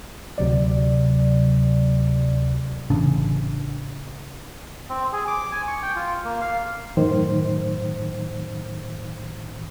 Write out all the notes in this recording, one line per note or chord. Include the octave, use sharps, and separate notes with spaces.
D2 C3 F#3 D5
A1 C#3 D4
C4
G#4
D6
G#5
C#6
G5
F4
A#3
F5
F#2 A2 D#3 C5